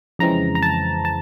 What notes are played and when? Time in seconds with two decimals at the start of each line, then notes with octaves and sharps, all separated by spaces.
0.19 F2 C#3 E3 G#3 C4 A#5
0.55 A#5
0.62 A5
1.05 A5